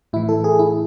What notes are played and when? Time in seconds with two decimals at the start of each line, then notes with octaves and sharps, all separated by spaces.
0.13 A2 E3 E4
0.29 A4
0.44 G#4
0.59 E4